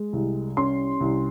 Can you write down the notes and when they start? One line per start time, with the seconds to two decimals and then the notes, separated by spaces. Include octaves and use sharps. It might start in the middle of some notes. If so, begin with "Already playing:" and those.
Already playing: G#3
0.13 C2
0.57 C#4 C6
1.00 C2